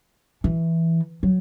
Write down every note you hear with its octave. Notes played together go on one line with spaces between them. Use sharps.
E3
F#3